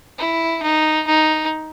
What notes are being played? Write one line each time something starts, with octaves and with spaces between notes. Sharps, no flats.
E4
D#4
D#4